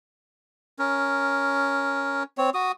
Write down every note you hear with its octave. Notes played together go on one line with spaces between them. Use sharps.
C#4 A#4
C4 C#5
F#4 D#6